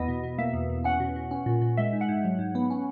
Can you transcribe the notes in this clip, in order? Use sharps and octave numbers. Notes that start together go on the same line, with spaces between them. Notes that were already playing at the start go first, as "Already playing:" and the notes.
Already playing: E2 B3 D#5
B2
B2
A#3 E5
E2
E2
C#4 F#5
B2
B2
C#4
A#2
A#2
G#3 E5
G#2
F#5
G#2
F#3
G#2
B3
C#4